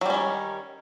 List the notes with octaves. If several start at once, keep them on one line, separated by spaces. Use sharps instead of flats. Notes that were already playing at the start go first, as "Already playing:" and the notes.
D#3 F#3 G3 C#4